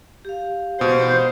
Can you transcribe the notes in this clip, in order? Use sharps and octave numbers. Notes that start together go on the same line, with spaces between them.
G4 F5
B2 C5